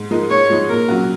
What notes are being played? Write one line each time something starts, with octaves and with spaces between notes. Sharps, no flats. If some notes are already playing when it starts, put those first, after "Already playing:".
Already playing: G#2
F3 G#3 D#4 A#4
G#2 C#5
F3 G#3 D#4
A#2 A#4
F#3 C#4 F#4